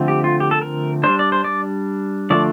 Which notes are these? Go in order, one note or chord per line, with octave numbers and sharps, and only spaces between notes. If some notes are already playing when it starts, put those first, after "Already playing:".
Already playing: D3 F3 A3 C4
G4
F4
G4
A4
A#4
G3 D4 C5
D5
C5
D5
D3 F3 A3 D4 D5